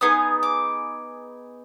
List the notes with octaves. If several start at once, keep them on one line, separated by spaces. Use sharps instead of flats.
B3 D#4 G#4 D#6
D6